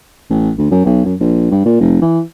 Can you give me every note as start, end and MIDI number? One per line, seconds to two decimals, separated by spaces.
0.30 0.51 33
0.58 0.71 38
0.71 0.84 42
0.85 1.04 35
1.05 1.14 42
1.20 1.49 34
1.51 1.63 43
1.65 1.78 46
1.80 2.01 29
2.01 2.20 52